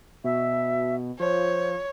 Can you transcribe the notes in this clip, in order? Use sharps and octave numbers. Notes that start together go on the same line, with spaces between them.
B2 E5
F3 C5 C#5